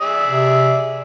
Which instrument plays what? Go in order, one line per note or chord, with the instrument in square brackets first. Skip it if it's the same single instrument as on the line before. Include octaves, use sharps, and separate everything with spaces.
[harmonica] G#4 D5 E5
[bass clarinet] C3